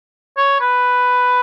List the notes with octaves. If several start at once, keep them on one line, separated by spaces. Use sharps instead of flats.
C#5
B4